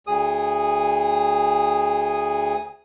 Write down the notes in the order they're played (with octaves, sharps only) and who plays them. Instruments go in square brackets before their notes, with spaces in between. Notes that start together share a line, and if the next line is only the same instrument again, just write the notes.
[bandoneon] D2 G#4 D#6